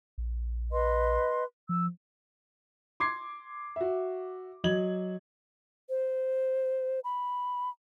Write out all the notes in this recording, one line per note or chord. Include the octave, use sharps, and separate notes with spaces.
A#1
B4 D#5 C6
F3 E6
C6 D6 G#6 C7
F#4 E5
F#3 D#5 G#6 F#7
C5
B5